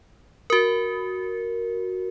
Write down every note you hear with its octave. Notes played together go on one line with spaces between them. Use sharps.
F#4 A#4